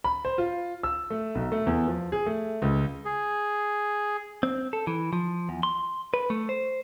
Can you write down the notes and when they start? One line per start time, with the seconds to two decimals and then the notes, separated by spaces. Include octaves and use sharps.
0.04 B5
0.25 C5
0.38 F4
0.83 E6
1.10 A3
1.35 B1
1.52 A3
1.67 E2
1.88 F3
2.12 G#4
2.26 A3
2.62 C#2
3.05 G#4
4.43 C4
4.73 A4
4.87 E3
5.13 F3
5.49 E2
5.63 C6
6.14 B4
6.30 A3
6.49 C5